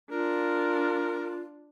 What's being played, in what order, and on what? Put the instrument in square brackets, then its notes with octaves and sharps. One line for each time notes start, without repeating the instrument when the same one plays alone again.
[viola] D4 [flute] F4 [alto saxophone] A#4